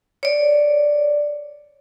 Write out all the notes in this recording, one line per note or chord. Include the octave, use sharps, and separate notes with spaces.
C#5 D5